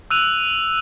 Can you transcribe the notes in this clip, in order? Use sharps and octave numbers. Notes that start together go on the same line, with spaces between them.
E6 F#6 D#7 F7